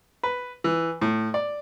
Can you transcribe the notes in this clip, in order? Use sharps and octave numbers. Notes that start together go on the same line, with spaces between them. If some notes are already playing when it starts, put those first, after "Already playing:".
B4
E3
A2
D5